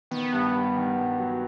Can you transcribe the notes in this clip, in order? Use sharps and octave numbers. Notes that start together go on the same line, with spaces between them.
D#3 B3
G2
G2
D#3
G2
F#3